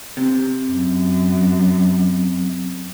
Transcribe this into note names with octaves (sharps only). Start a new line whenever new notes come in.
C3
F#2